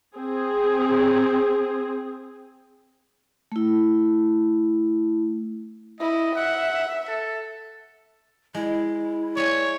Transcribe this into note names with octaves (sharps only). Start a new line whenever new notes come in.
C4 G#4
A3 E4
E4 D#5
E5 F#5
A4
G#3 E4
C#5 D5 E5 G#5